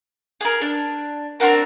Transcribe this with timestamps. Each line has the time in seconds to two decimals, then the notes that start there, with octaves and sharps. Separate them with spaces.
0.41 G#4 A#4
0.61 D4
1.40 C4 D4 F#4 A#4